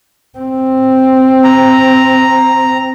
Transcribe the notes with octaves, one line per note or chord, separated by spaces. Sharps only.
C4
A#5